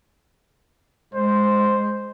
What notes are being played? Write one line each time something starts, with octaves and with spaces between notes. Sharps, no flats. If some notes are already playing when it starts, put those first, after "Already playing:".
G#3 C5